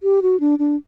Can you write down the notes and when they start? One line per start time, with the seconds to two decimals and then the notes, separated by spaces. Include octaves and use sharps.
0.03 G4
0.22 F#4
0.40 D4
0.59 D4